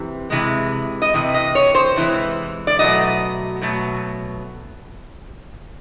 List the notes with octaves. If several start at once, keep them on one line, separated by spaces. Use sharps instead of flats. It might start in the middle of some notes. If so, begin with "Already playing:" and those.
Already playing: C3 E3
C3 E3 G#3
D#5
C3 E3
D#5
C#5
C5
C3 E3 G#3
D5
B2 F#3 A3 D#5
B2 F#3 A3